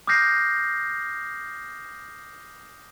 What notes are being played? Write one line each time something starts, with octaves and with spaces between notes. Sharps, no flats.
D6 D#6 F6 G6 A#6 C7